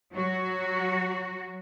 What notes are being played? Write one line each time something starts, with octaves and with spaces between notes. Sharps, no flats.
F#3 F#4